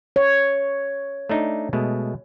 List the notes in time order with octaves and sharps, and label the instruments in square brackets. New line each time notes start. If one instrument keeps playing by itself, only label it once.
[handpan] C#5
[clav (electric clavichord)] A3 D4 D#4
B2 G#3 A3